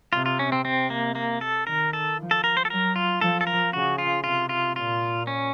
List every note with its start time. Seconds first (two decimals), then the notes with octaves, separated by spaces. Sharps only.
0.13 C3 F4
0.26 F4
0.39 C#4
0.52 C4
0.64 C3 C4
0.90 A#3
1.15 A#3
1.41 A4
1.67 D#3 A#4
1.93 A4
2.18 F3
2.31 A4
2.44 A#4
2.57 C5
2.65 A4
2.70 F#3 A#4
2.96 F4
3.21 F3 A4
3.41 A4
3.47 A#4
3.73 C#3 F#4
3.98 F4
4.24 C3 F4
4.49 F4
4.75 A#2 F4
5.27 C#4